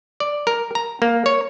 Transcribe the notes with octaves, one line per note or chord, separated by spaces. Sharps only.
D5
A#4
A#5
A#3
C#5